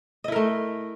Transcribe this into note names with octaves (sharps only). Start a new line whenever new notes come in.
A3 E4 A#4 D#5